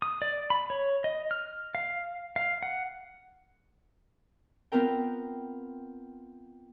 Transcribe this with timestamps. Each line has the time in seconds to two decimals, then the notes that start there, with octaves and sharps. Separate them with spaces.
0.02 D#6
0.22 D5
0.50 B5
0.70 C#5
1.04 D#5
1.31 F6
1.75 F5
2.36 F5
2.63 F#5
4.72 B3 C4 F4 A#4 G5